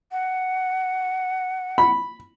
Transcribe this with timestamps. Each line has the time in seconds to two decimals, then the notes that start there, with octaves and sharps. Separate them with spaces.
0.12 F#5
1.78 B5